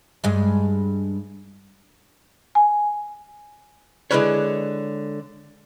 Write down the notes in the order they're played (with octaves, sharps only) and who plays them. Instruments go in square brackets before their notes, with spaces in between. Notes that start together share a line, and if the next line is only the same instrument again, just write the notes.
[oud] G2 G#3
[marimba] G#5
[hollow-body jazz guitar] D3 G#3 E4 A#4 B4 C#5